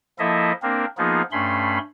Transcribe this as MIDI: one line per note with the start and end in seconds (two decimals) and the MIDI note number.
0.19 0.52 53
0.19 0.52 58
0.19 0.52 64
0.19 0.52 69
0.19 0.52 75
0.19 0.52 76
0.62 0.85 58
0.62 0.85 60
0.62 0.85 62
0.62 0.85 70
0.98 1.22 53
0.98 1.22 58
0.98 1.22 59
0.98 1.22 63
0.98 1.22 65
0.98 1.22 68
1.32 1.78 43
1.32 1.78 57
1.32 1.78 61
1.32 1.78 83
1.32 1.78 84